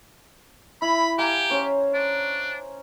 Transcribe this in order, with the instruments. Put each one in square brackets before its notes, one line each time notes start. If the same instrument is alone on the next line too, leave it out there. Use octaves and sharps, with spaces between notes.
[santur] E4 [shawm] B5
[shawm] G4 [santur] F5 G#5 A#5
[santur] C#4 C5
[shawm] D4